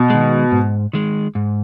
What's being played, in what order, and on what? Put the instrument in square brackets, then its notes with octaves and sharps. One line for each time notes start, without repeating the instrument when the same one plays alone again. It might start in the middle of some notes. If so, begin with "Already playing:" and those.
Already playing: [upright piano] B2
[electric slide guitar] D#3 G#3
G#2
D#3 G#3
G#2